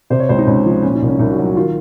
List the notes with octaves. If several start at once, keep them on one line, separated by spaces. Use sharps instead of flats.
C3 C5
C#5
C#2 C5
D#4
C#2 C#4
F3
A#2 C#4
D#4
C2
C#4
C2 D#4
F#4
F#3
F#4
D#3 F4